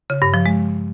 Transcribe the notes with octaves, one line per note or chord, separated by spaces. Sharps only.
C#3
G2
F3
G#3